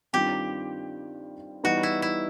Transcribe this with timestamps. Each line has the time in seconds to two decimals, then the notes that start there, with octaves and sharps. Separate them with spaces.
0.13 G2 D#3 G3 C4 F4 G4
1.63 E3 G3 B3 D#4 F#4
1.83 E4
2.02 E4